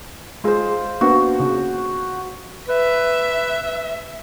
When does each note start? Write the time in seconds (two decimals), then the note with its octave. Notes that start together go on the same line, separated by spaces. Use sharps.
0.44 G#3 F4 G#4 C5
1.01 A#3 B3 D4 F#4
1.40 C#3
2.69 B4 E5